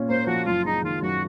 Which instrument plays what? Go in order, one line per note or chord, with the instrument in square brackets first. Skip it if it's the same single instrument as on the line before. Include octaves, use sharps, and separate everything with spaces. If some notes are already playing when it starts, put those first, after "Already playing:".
Already playing: [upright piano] A#2 C#4
[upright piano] A#3 [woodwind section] C5
[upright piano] F3 [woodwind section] F#4
[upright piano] F#1 [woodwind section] F4
[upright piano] G#3 [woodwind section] D#4
[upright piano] D#3 [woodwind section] F4
[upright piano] F#2 [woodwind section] F#4